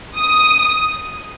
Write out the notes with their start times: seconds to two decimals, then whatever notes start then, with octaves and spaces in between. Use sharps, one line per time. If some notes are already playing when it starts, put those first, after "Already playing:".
0.17 D#6